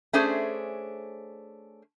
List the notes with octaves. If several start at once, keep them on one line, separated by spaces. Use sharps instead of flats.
A3 C#4 D4 G#4 C5